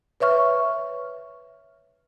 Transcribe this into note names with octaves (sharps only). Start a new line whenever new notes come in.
B4 C#5 E5 C#6 F6